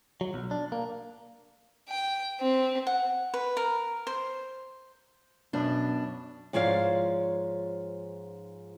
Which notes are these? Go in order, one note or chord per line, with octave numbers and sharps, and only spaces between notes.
F#3
B1
D4
A#3
G5
C4
F#5
B4
A#4
C5
F#2 B2 D4
G#2 F3 C#5 D5 F5